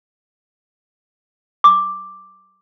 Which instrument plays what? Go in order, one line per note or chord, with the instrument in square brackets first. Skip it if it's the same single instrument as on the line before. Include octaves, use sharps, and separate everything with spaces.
[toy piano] D6